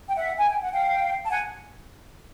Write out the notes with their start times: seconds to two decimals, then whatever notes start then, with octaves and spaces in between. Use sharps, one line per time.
0.09 G5
0.16 E5 F#5
0.39 G#5
0.50 G5
0.61 F#5
0.72 F5 G5
1.24 A5
1.30 F#5 G#5